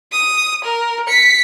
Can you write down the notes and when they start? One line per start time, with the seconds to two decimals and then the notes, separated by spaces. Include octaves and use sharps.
0.12 D#6
0.65 A#4
1.07 B6 C#7